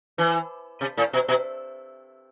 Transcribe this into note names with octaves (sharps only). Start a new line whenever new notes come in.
E3
C3
A2
B2
B2